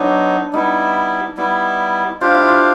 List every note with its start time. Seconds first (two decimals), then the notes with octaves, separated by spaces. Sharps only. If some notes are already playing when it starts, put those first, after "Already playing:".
Already playing: F#3 B3 D4 D#4
0.53 G3 B3 D#4 E4
1.37 G3 B3 E4
2.21 D4 F4 G4 C5 F5
2.35 E4
2.48 F4